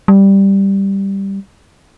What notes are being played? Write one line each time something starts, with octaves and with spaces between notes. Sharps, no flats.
G3